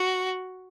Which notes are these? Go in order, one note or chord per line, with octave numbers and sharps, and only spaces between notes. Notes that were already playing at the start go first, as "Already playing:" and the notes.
Already playing: F#4